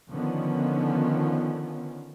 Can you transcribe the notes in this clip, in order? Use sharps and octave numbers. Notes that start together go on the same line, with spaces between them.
D3 D#3 F3 B3 C#4